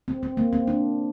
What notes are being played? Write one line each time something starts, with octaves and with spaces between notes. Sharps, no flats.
C4
C4
A#3
C4
D4